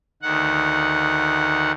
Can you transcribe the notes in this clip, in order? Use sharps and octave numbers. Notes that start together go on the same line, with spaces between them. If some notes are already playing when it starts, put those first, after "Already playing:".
D2 D#3 F#5